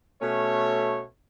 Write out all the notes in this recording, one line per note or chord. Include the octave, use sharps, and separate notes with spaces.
B2 A3 C#4 C#5